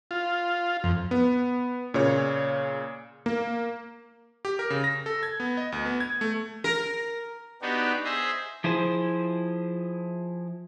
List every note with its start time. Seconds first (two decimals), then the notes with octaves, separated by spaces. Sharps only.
0.11 F4
0.84 F2
1.11 B3
1.94 A#2 C#3 C#5
3.26 A#3
4.45 G4
4.59 A#4
4.70 C#3
4.84 A#6
5.06 A4
5.23 G#6
5.40 B3
5.57 D#5
5.72 D2
5.85 B3
6.00 G#6
6.21 A3
6.64 A#4
7.62 B3 D4 D#4 F#4 G4
8.04 G#4 C5 D#5 E5
8.64 F3 E4 G#4 C5